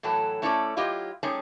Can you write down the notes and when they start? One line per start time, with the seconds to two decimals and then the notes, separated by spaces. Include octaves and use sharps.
0.03 A2 E3 F#3 A4
0.42 A3 C#4 E4 A4 C5 D5
0.77 F#3 E4 F4 G4 D#5
1.23 G3 A3 C#4 D#4 G#4